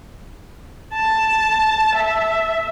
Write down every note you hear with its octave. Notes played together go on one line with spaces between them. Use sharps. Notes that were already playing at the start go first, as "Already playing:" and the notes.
A5
E5